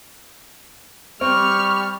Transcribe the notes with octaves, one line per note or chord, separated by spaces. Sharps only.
G3 C4 C#6 F6